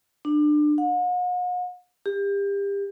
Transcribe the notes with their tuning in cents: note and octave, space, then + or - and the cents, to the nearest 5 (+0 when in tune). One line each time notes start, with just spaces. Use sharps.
D4 +25
F#5 -45
G4 +30